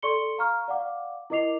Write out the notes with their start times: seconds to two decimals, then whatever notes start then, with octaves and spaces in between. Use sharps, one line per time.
0.02 A4 D5 C6 C#6 C#7 G7
0.38 F5 A#5 C#6 F6
0.68 D5 F5 F#5 D6
1.30 E4 A#4 D#5 D6 C7 F7